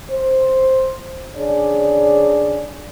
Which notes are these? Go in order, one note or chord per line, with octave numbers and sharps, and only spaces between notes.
C5
C#3 D4 G#4 C#5 D5